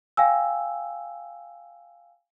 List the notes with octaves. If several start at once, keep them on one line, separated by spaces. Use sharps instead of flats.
F5 G5 G#5 E6